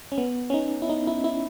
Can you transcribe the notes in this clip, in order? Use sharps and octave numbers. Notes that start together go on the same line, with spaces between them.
C#4
B3
C#4
D#4
E4
D#4
E4
E4